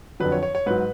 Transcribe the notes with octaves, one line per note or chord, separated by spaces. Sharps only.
F2 D3 F#3 B4
C#5
C#5
C#5
G#2 F#3 B4